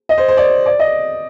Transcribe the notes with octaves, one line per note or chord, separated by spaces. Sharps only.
D#5
C5
C5
D5
D5
D#5